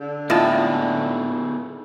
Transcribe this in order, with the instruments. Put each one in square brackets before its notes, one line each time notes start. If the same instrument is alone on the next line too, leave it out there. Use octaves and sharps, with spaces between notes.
[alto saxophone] D3
[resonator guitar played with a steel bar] A2 [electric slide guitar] B3 D#4 G#4 [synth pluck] F4 D#5 A5